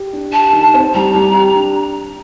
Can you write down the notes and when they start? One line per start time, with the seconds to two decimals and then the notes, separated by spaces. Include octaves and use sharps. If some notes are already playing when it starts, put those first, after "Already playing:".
Already playing: G4
0.13 D4
0.33 G4 A5
0.53 D#3
0.74 C4
0.94 G3 A#5
1.15 G3
1.34 G4
1.56 D4